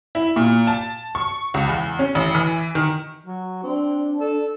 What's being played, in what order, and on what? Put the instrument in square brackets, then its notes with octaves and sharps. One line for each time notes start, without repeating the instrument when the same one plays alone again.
[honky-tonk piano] E4
A#2
A5
C#6
C#2
E2
C#4
A1
E3
D#3
[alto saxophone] F#3
[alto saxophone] C4 [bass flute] D4
[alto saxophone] A4